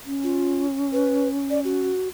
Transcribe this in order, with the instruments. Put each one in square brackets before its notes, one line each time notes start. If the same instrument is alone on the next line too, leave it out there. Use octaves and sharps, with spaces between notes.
[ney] C#4
[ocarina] F4
B4
D5
F#4